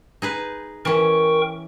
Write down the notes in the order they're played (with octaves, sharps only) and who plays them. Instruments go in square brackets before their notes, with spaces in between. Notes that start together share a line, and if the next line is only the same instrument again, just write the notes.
[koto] D#4 G#4 B4
[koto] E3 C#4 [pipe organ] A#4 G5 C#6